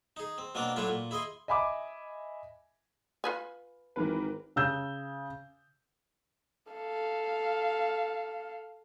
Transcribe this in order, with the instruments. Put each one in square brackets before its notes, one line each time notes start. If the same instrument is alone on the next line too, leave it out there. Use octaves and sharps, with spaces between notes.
[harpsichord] D#4 G#4
C4
B2 A#3 C4 D4 A#4
A2 F#3 A3 D4 E4 F4
A#2
E4 G#4 D#5 C6
[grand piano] D#5 E5 G#5 B5 D6
[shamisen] F4 B4 G#5
[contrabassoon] G#1 [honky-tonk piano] E3 A#4 B4
[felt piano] C#3 E6 G6
[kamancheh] A4 F5